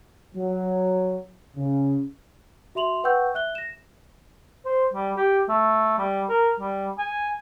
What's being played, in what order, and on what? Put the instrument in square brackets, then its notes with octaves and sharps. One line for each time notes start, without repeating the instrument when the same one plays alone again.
[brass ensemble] F#3
C#3
[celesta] F#4 E5 C6 F7 F#7
B4 F#5 G5 C#6 E6 G6
E5 F#6 G7
A#6 E7
[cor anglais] C5
G3
G4
A3
G3
A#4
G3
G#5